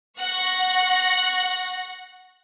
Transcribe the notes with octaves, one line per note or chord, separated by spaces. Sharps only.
F#5 C#6 F#6 A#6